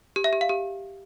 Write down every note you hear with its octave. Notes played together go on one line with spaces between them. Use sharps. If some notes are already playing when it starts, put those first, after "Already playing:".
G4
E5
G4
F5
G4